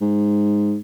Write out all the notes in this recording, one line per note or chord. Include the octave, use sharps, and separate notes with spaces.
G#2